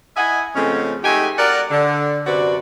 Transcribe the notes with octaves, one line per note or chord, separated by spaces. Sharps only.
E4 D#5 E5 F#5 G#5
C#3 F3 G#3 A3 C4 C#4
G#3 A3 D#4 G4 F#5 G#5
A#4 D5 F#5
D3
F#2 C3 F#4 B4 D5